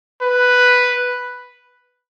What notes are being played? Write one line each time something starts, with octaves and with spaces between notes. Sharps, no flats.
B4